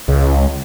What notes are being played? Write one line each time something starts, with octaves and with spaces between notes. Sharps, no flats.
C#2